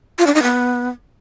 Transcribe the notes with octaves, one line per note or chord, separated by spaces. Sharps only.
F4
D4
D#4
B3